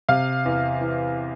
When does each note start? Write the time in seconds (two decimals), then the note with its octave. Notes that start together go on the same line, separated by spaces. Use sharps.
0.09 C3 F5
0.46 E2
0.81 E3